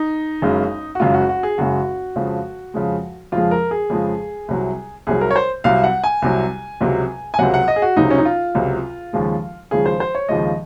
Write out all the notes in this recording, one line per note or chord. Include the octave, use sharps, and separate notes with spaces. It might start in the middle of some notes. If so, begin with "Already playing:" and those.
Already playing: D#4
F#1 F#2 C#3 G#3
F#4
F#1 F#2 C#3 G#3 F4
F#4
F#4
G#4
F#1 F#2 C#3 G#3 F#4
F2 C#3 F3 G#3
F2 C#3 F3 G#3
F2 C#3 F3 G#3 F4
A#4
G#4
F2 C#3 F3 G#3
C2 C3 F#3
C2 C3 F#3 G#4
A#4
C#5
C5
C2 C3 F#3 F5
F#5
G#5
C2 C3 F#3
C#2 C3 F#3
G#5
C#2 C3 F#3 F#5
F#5
D#5
G#4
F#4
C#2 C3 F#3 D#4
C#4
D#4
F4
C#2 C3 F#3
D#2 C#3 F3 G#3
D#2 C#3 F3 G#3 G#4
C5
C5
C#5
D#2 C#3 F3 G#3 D#5